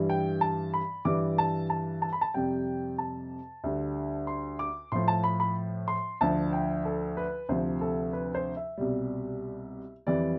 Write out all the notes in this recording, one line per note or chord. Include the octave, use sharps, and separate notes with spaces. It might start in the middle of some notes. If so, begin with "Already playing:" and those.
Already playing: G2 E3 G3
G5
A5
B5
G2 E3 G3 D6
A5
A5
A5
B5
A5
F2 C3 G3 G5
A5
D2 D3 G3
C6
D6
A2 F3 C6
A5
B5
B5
C6
D2 D3 F3 A5
G5
A4
B4
D2 C3 F3 C5
A4
B4
C5
E5
C2 B2 G3
F2 E3 G3 D5